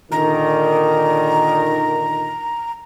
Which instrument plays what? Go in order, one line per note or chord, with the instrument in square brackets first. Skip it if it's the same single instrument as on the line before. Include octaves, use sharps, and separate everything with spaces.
[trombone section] A#2 D3 D#3 [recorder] A#5